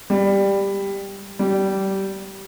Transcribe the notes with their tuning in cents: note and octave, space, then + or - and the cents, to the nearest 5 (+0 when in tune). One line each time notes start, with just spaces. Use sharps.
G3 +10
G3 -20